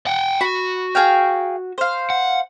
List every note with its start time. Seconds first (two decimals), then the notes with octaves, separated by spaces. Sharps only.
0.06 F#5 G5
0.41 F#4 B5
0.95 G#4 F5 G5
1.78 C5 F5
2.10 F#5